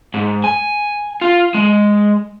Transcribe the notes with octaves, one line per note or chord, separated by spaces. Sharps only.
G#2
G#5
F4
G#3